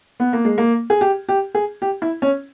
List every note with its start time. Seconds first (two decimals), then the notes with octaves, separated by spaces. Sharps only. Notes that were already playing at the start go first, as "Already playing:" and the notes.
0.20 B3
0.33 A#3
0.45 G#3
0.58 A#3
0.90 G#4
1.01 G4
1.29 G4
1.55 G#4
1.82 G4
2.02 E4
2.22 C#4